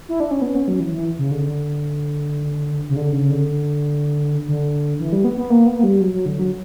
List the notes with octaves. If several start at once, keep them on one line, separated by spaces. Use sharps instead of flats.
E4
D4
C#4
B3
C#4
F#3
E3
E3
C#3
D3
D3
C#3
D3
C#3
D3
D3
E3
G3
B3
B3
A#3
B3
A#3
G3
F#3
F#3
D3
F#3